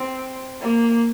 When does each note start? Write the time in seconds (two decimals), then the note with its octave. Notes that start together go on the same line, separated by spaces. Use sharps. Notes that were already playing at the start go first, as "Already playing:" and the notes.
Already playing: C4
0.61 A#3